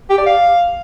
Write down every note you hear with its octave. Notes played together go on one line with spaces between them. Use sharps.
G4
D5
F5